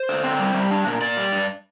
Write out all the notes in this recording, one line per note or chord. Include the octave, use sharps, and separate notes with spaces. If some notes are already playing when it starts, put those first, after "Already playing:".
Already playing: C5
D3
C4
G3
G3
D4
A#2
A#2 D5
G3
G2